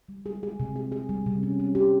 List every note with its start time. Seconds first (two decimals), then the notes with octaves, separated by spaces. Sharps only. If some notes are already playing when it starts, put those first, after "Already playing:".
0.09 G3
0.26 G#4
0.43 G#4
0.60 C3
0.76 G#4
0.92 G#4
1.09 G3
1.26 C3
1.43 C#4
1.60 C#4
1.75 G4